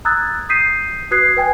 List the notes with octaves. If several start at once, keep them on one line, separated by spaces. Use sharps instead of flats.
A#5 D#6 E6 F#6 G#6 A6
D#6 G6 B6 C7 D#7
F#4 B4 D#6 F#6 G#6 C7
B4 G5 G#5 G#6